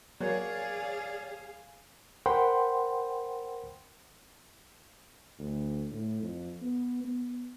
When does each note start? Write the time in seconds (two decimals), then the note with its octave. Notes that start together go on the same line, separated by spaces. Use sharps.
0.21 F#3 A#3 G#4 C#5 D5 F5
2.26 A#4 C5 F#5 G5 B5 C6
5.39 D2
5.91 A2
6.23 F2
6.62 B3
7.04 B3